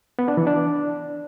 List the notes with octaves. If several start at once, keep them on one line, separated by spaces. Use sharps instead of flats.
B3
D4
E3
D4